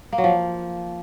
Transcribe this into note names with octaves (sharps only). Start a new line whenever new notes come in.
A#3
F#3
F3